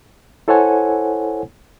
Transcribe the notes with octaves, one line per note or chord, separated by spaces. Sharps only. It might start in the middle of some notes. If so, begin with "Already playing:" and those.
E4 A4 C5 C#5 F#5 G#5